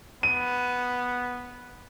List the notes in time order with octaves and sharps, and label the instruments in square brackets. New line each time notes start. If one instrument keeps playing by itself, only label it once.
[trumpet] B3 [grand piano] D#7